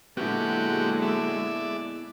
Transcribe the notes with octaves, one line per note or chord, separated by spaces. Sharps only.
A#2 D3 F#3 G#3 B3 E4 F#4 G4
D5 E5